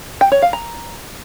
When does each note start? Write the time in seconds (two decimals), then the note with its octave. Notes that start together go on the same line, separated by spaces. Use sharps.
0.21 G5
0.32 C#5
0.42 F5
0.53 A#5